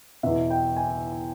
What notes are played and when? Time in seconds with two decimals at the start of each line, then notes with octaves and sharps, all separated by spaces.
0.23 E2 B2 E5
0.50 G5
0.77 G#5